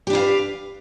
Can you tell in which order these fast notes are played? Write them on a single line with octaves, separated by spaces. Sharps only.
G4 D4 E4 F5 B4